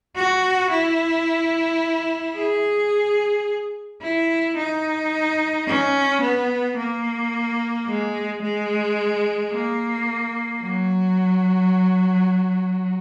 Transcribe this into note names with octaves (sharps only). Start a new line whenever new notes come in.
F#4
E4
G#4
E4
D#4
C#4
B3
A#3
G#3
G#3
A#3
F#3